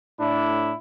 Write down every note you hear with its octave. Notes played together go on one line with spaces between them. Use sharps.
A2 D4 E4